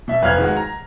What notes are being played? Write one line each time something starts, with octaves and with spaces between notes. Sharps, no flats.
B2 E5
F1 B4 F5 F6 G#6 F7
D#3 G#3 F#4
A#5